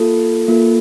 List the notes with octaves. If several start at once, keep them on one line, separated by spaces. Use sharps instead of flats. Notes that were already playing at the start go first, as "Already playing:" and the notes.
Already playing: A#3 F4 A4
A#3 F4 A4